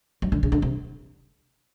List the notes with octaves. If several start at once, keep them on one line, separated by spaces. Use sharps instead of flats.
F#3
D3
C#3
D3
C3